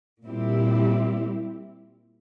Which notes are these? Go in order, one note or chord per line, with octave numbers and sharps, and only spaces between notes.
A#2 G3 C4 E4 G4